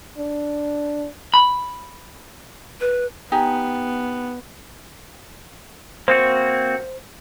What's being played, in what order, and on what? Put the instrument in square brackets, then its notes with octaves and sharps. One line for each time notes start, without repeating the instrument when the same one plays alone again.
[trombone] D4
[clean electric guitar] B5
[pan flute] B4
[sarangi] B3 [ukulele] D#4 G4 G#5
[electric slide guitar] A#3 C4 F#4 [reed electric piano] C5